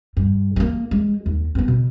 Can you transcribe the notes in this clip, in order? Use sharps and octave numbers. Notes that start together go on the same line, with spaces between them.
G2
G#3 A#3
G#3
D#2
G2 B3
B2